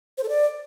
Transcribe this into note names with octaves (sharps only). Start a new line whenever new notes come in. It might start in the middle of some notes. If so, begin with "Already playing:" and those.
C5
A4
D5